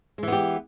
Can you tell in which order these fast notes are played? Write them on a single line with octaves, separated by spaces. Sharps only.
G#3 E3 B3 G4